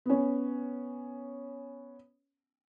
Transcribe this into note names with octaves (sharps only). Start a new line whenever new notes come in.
B3 C#4